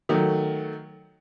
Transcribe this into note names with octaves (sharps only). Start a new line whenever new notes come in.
D#3 F#3 A3